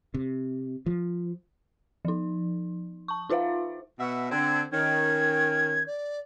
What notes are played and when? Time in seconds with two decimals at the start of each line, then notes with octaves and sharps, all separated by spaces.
0.14 C3
0.86 F3
2.05 F3 D#4
3.08 A5 C#6
3.30 D#4 F4 C5 E5 F5
3.99 B2 E5 F#5
4.31 D3 C4 G#6
4.72 D#3 C#4 G#6
5.87 D5